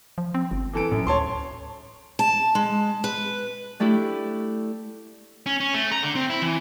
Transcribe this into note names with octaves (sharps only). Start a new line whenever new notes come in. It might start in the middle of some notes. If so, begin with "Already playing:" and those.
F3
C4
G1
E3 A4 D7
F#2 A2
D2 C#5 A5 C6
A5
G#3
B4
A3 D4 E4 G4
C#4
C#4
A3
A#5
D3
C4
E4
E3